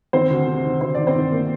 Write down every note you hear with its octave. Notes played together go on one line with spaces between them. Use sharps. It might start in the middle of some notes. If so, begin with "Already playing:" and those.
D#3 C4 C5
D2
C3
D#3
D2 C5
D#3 D5
C4 C5
D#3
A#3